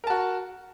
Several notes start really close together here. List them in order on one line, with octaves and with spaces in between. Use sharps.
A#4 A5 F#4